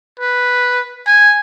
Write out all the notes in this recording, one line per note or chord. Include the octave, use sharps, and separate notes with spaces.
B4
G#5